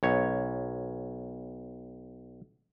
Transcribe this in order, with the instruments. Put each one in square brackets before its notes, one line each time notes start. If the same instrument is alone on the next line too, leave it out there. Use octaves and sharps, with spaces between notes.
[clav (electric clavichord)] B1 C#5